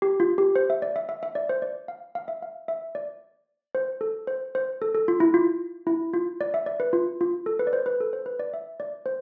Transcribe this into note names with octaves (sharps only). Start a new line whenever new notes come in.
G4
F4
G4
C5
E5
D5
E5
E5
E5
D5
C5
D5
F5
F5
E5
F5
E5
D5
C5
A4
C5
C5
A4
A4
F4
E4
F4
E4
F4
D5
E5
D5
B4
F4
F4
A4
B4
D5
C5
B4
A4
C5
B4
D5
E5
D5
C5